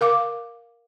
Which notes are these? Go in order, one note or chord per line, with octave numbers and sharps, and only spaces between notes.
A#4 F5 D6